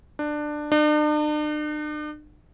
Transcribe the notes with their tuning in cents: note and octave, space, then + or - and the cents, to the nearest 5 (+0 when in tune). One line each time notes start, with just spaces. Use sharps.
D4 +20
D4 +45